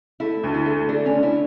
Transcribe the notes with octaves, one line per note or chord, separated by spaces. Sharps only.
A3 E4
D2
E4
A3
A3 D4
C#4
D3
E4